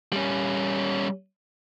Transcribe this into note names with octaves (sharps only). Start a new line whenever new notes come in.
G3 C#4